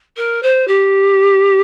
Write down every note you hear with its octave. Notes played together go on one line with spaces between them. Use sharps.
A#4
C5
G4